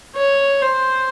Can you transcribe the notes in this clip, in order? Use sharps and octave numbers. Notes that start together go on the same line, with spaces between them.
C#5
C5